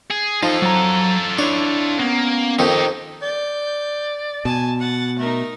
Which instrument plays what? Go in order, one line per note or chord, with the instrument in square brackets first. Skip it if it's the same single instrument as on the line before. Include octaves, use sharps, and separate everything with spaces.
[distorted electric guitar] G#4
[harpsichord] F3 [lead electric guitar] D#4 [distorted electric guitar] F4 A4
[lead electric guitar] F#3 A#5
[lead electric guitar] D4 E4 [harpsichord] C#5
[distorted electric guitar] A#3 [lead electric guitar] B3 C#4
[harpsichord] F2 D#3 [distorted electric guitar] D#4 G4
[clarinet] D5 [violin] G6
[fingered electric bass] B2 [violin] G#5 A5
[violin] F#5 A6
[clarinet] A3 [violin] D#4 A#4